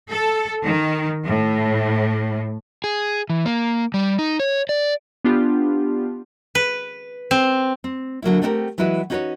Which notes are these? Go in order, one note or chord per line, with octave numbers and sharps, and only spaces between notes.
A4
D#3
A2
G#4
E3
A#3
G3
D#4
C#5
D5
B3 D4 F4 G4
B4
C4
C4
D3 F#3 A#3 E4
A3 C4 D4 E4 G4 A#4
E3 F#3 G#3 E4 F#4 B4
C#4 D#4 F#4 G#4 B4 C#5